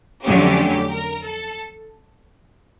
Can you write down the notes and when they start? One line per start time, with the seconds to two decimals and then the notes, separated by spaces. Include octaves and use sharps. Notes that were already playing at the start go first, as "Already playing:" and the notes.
0.25 F2 D3 F#3 A3 C#4 G4
0.91 A#4
1.24 A4